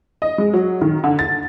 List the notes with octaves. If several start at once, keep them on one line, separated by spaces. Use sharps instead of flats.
D#5
G#3
F#3
D#3
D3
A6